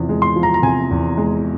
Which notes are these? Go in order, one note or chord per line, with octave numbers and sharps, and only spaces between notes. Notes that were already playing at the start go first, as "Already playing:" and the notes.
Already playing: E2 C3 F3
G#3
C6
F3
A#5
A#5
C3 G#5
E2
G#3